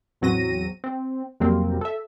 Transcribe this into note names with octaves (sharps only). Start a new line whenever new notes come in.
A1 E2 F#3 C4 A#6 D#7
C4
F2 C3 F#3 G3 A#3 C4
A4 E5